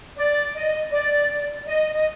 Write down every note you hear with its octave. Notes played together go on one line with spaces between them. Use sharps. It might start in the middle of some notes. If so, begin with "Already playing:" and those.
D5
D#5
D5
D#5
D#5